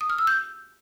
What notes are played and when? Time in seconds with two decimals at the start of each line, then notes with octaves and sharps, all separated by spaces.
0.01 D#6
0.10 F6
0.18 E6
0.27 G6